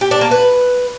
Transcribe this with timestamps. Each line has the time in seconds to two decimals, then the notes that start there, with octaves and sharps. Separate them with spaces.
0.01 G4
0.11 D4
0.21 A#3
0.31 B4